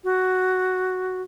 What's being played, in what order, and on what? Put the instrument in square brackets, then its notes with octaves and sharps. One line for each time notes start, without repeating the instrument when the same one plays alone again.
[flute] F#4